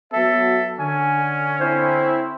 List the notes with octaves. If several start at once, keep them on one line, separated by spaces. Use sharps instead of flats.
F#3 B3 F#4 A4 E5
D3 C#4 G#5
C4 E4 C5